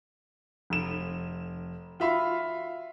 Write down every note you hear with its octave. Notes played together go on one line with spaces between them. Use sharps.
F1 E7
F4 F#4 E5 F5 B5